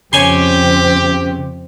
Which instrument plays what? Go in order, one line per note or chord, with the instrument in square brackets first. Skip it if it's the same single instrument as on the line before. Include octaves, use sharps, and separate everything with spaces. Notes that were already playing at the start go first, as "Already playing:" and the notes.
[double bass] F2 C4 [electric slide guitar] C#3 [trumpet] G4 [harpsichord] C#5 G#5 C6